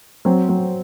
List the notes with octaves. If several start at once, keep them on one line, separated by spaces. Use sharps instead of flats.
F#3 C4
F#3